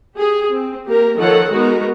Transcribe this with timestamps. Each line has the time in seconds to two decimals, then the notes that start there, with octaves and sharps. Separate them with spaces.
0.16 G4 G#4
0.51 C4
0.88 A#3 G4 A#4
1.18 D#3 F3 F4 A4 C#5 F#5
1.52 G#3 B3 D#4 F#4 A#4